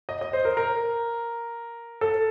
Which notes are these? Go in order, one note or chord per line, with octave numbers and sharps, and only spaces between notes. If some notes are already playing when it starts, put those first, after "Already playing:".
D#5
D#5
C5
A#4
A#4
A4